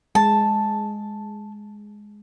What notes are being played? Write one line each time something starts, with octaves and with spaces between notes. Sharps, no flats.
G#3 A5